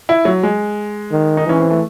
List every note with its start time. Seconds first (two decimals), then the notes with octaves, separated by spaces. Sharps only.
0.09 E4
0.25 F#3
0.43 G#3
1.12 D#3
1.37 D#4
1.47 E3 C#4
1.60 C4
1.70 A3